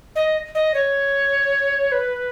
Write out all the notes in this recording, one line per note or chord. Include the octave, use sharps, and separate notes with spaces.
D#5
D#5
C#5
B4